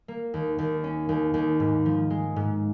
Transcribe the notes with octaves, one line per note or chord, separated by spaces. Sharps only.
A#3
D#2
D#2
C#4
D#2
D#2
G#2
F3
G#3
G#2